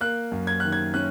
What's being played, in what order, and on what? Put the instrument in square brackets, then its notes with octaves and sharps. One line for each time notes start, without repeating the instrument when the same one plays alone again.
[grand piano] A#3 F#6
F#2
G#6
D#3 F#6
G#6
C#4 F#6